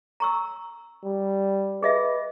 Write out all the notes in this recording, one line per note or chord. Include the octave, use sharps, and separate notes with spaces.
A#5 C#6 E6
G3
G#4 B4 D#5 E5